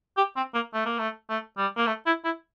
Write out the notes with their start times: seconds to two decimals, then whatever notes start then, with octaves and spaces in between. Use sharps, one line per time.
0.17 G4
0.36 C4
0.54 A#3
0.74 A3
0.86 A#3
0.99 A3
1.29 A3
1.58 G3
1.77 A#3
1.87 A3
2.06 E4
2.25 E4